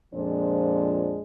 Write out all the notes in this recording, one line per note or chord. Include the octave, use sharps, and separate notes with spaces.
F2 A#2 F3 G#3 D4 C5